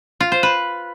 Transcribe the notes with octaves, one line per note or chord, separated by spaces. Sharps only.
F4
C5
B4